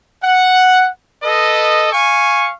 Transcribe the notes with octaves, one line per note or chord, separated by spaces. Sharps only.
F#5
A4 B4 D#5
F5 G#5 C#6